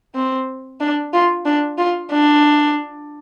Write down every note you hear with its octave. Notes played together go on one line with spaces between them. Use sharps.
C4
D4
F4
D4
F4
D4